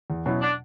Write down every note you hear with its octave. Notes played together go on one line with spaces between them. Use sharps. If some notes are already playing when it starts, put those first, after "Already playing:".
E2
B2 F#3 C#4 E4
D4